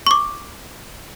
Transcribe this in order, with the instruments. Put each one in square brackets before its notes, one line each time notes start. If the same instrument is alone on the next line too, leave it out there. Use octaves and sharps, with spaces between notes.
[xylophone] C#6 D6